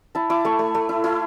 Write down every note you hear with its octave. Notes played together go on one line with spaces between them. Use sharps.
E4 A5
E4 D6
A3 C#6
A3
A3
E4
E4